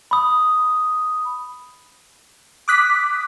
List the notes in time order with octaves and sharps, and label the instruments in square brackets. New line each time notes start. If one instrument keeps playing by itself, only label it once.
[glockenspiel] B5 D#6
[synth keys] D6 D#6 F#6 B6